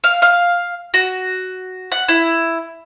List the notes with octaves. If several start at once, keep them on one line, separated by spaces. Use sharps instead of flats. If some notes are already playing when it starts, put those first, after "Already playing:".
F5
F5
F#4
F#5
E4